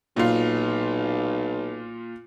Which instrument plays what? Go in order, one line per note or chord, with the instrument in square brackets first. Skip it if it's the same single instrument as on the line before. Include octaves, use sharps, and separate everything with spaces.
[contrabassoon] B1 [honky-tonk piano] A#2 F4